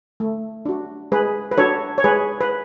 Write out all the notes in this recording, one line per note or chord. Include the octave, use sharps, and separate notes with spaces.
A3
D4 F#4
G#3 G#4 B4
B4
D4 F#4 A4 C#5
C#5
G#3 G#4 B4
B4